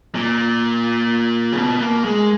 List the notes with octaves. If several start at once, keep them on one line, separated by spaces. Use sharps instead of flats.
A#2
C#3
B2
A#3
G#3